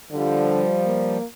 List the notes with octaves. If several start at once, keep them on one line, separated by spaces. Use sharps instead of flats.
D3 F3 G3
A#3